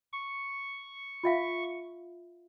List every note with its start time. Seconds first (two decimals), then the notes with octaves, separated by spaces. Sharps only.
0.13 C#6
1.23 F4 E5 F5